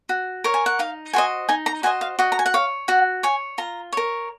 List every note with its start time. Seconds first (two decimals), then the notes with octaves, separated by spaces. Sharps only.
0.09 F#4
0.44 A#4 C#5
0.54 G#5
0.66 F#5
0.79 D#4 F5
1.13 F#4 C5 D#5 G#5
1.49 D#4 G#5
1.66 A#5
1.83 F#4 C5 D#5 G#5
2.01 F5
2.19 F#4 D#5
2.32 A#5
2.39 G#5
2.46 F#5
2.54 C#5 F5
2.88 F#4 F#5
3.23 C#5 G#5
3.58 F4 A#5
3.93 A#4 C#5